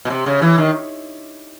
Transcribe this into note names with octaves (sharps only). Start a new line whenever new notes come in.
B2
C3
C#3
E3
D#3